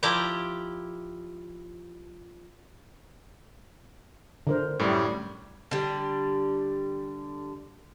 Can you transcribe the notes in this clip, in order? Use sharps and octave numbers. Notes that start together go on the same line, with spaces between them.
F3 E4 G4 D5 A#5
D3 A#4 C5
F#2 A2 G3
D3 G3